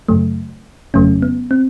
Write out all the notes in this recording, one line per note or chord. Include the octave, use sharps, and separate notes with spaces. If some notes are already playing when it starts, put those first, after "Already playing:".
F#2 C#3 F#3 A3
G1 F2 C#3 F#3 A3 C#4
B3
C4